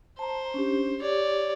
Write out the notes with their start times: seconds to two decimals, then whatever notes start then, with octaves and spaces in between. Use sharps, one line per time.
0.19 C5 A5 A#5
0.54 C#4 D4 G4
1.01 G4 C#5 D5